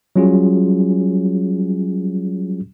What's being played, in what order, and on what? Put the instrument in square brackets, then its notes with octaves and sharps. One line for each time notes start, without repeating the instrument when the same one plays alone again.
[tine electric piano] F#3 G3 C#4 F4 F#4 G#4